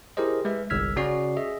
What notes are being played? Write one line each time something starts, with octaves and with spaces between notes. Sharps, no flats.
E4 G4 G#4 A#4 C5 D#5
G#3 B4 E5
G1 C2 E6 F6 G#6 B6
C#3 C#4 F#4 D5 C7
G#4 D#5 E5